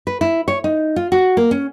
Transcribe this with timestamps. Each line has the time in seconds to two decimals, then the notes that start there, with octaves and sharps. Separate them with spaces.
0.07 B4
0.21 E4
0.48 C#5
0.64 D#4
0.96 F4
1.12 F#4
1.37 A#3
1.51 C#4